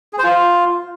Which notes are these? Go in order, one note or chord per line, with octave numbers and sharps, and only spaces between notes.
G#4
C5
F4